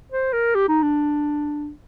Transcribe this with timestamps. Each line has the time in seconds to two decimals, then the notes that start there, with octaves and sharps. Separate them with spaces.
0.12 C5
0.33 A#4
0.55 G4
0.69 D#4
0.82 D4